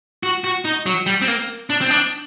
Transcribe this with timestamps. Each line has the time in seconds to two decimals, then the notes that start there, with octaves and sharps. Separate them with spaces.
0.23 F#4
0.44 F#4
0.65 D#4
0.86 F#3
1.06 G3
1.21 C4
1.28 A#3
1.70 D4
1.81 C4
1.90 D4